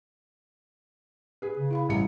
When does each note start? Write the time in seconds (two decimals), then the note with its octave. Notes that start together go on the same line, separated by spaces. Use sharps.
1.42 G#4 B4
1.57 C#3
1.71 E4 F5 B5
1.89 A1 E3 G3 F#4 A#5 C#7